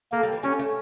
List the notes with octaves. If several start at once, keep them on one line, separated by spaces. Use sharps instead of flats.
A3 A#3
G3
E3
G3 C#4
A3